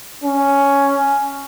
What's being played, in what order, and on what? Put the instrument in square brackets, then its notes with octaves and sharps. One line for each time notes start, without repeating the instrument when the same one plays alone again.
[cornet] C#4